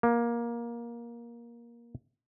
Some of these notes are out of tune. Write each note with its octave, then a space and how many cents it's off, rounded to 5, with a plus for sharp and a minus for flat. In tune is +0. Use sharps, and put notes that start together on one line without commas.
A#3 +15